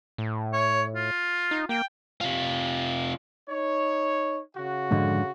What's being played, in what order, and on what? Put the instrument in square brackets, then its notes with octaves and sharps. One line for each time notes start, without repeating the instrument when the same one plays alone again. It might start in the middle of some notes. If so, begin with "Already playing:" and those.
[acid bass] A2
[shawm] C#5
F4
[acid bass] D#4
[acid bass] A#3 [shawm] G5
[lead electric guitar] C3 F4
[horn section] D#4 C#5
C#3 F#4
[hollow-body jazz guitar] F2 G#2 D3